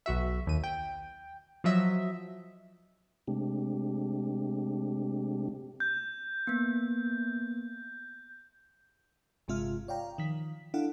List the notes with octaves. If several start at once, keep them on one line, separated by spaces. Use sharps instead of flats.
B1 F#4 E5
D#2 D#7
G5
F3 F#3 D#5 E5
C3 G#3 A3 C4 D4 G4
G6
A#3 B3
G1 C3 G#3 F4 E5 F6
C#5 D5 F5 G5 A#5
D#3 F3 B6
D4 E4 A4 F5 F#5